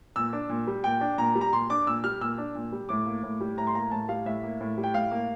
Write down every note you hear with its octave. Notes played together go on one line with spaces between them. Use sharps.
A#2 E6
D4
A#2
G3
A#2 G5
D4
A#2 A#5
G3
A#5
A#2 C6
D4 D6
A#2 E6
G3 F6
A#2 E6
D4
A#2
G3
A2 D6
A#3
A2
G3
A2 A#5
C6
A#3 A#5
A2 A5
G3 F5
A2 E5
A#3
A2
G3
G5
A2 F5
A#3